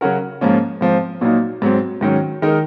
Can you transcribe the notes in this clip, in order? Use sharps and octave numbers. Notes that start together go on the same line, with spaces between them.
C#3 F#3 C#4 F#4 A#4
G#2 F3 A#3 C#4
G#2 F3 C4
A#2 F#3 A#3 D#4
G#2 F#3 C4
G#2 D#3 F#3 C#4
D#3 G#3 D#4 A#4